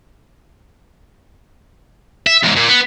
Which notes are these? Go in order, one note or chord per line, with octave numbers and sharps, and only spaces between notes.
E5
E2 G#2
A#2
B3